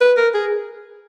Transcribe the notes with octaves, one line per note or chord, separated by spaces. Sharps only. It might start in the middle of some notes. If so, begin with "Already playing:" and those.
B4
A#4
G#4